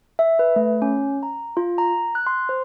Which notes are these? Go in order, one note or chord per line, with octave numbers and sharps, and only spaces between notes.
E5
B4
A3
C#4
A#5
F4
A#5
F#6
C6
C5